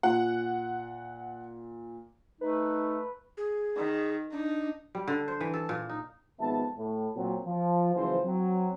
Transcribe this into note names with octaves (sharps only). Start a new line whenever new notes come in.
A#2 F#5
A3 D#4 B4
G#4
D#3
D4 D#4
G3
D3
C5
E3
A4
A#2
D#4
G#1 F2 B3 E5 A5
A2
A#2 F#3 C4
F3
F#1 E3 F3 C5
F#3 C4